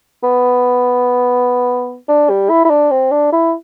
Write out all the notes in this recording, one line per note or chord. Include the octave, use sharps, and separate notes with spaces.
B3
D4
G3
E4
E4
D4
C4
D4
E4